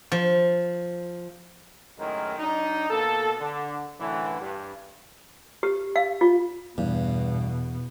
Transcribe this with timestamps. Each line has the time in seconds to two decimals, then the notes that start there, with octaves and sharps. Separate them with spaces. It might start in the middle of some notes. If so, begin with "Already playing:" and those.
0.12 F3
1.99 F#2 A2 D#3 G#3 A#4
2.39 F#3 D4 D#4
2.89 B2 A#3 A4
3.41 D3
4.00 F#2 A2 D3 E3
4.40 G2
5.63 G4
5.96 F5
6.21 F4
6.78 E2 G2 B2